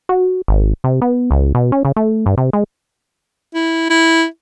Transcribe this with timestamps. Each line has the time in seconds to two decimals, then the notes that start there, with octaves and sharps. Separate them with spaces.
0.09 F#4
0.48 G#1
0.84 C3
1.02 B3
1.31 C#2
1.55 B2
1.72 C#4
1.85 C#3
1.96 A3
2.26 G2
2.38 C3
2.53 G#3
3.54 E4
3.90 E4